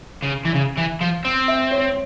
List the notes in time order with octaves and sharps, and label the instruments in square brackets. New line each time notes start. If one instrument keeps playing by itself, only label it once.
[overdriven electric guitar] C#3
E3
C#3
E3
F3
C4
[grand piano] E5
C#5